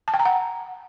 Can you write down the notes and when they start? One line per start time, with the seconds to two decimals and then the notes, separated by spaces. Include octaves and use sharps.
0.08 A5
0.14 G5
0.20 A#5
0.25 F#5